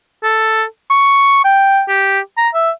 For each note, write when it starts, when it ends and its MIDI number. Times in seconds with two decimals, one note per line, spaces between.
0.23 0.64 69
0.90 1.40 85
1.44 1.82 79
1.89 2.20 67
2.37 2.49 82
2.54 2.71 76